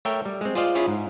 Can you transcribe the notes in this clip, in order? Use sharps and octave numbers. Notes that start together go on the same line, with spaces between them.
A3 A#4 C#5 E5 G5
G3
G#3 C4
F4 G#4 C5 D5 D#5 F5
C#4 E4 F4 G#4 C#5
G#2